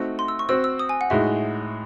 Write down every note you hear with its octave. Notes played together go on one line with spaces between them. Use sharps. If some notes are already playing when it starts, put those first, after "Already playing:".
Already playing: A3 C4 D#4 F#4
C6
E6
C#6
C4 F#4 C5 E6
E6
D#6
G#5
F#5
A2 G#3 D#4 F#4 E5